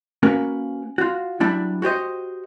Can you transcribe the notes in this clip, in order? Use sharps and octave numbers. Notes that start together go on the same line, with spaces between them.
A#3 C#4 F#4 A#4 B4
F4 F#4
F#3 G3 D4 E4
F#4 G4 C5 D#5